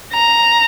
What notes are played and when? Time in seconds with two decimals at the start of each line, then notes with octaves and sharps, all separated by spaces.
0.13 A#5